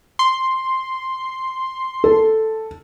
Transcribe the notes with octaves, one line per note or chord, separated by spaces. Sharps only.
C6
A4